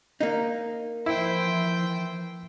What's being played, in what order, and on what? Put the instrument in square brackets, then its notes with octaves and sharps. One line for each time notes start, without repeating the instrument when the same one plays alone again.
[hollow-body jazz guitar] A#3 D#4
[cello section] E3 F3 [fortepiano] E4 [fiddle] C5 G5